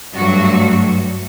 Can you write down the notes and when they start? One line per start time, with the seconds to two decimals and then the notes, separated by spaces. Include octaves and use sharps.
0.16 G2 F#3 A3 F#4